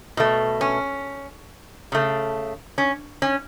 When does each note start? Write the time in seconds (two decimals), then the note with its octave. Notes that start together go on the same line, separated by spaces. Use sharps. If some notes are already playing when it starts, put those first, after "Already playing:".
0.17 B2 A3
0.61 C#4
1.92 C#3 A3
2.78 C#4
3.22 C#4